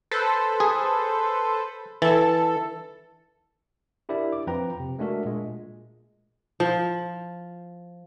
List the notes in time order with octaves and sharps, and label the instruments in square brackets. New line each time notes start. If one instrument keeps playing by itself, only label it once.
[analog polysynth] A4 B4 C5
[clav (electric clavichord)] G#4
[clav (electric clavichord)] E3 [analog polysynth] A4
[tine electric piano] D4 E4 G4 A#4 D5 E5
D6
F2 F3 B4 G5 A#5
C3
G#3 A3 D4 F#4 A#4 E5
A#2 G#3
[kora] F3